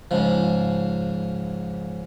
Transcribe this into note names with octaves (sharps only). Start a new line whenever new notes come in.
G#2 C#3 F3